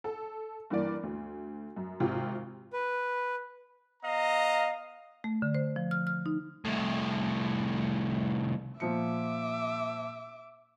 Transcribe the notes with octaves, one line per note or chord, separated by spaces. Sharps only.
A4
G2 E3 A#3 D5
D2
F#2
G#1 C3 F4
B4
B3 D#5 F5 A#5
A3
D3
C5
F3
F6
F6
D#4
C2 A2
A#2 F3 E5 D6 C#7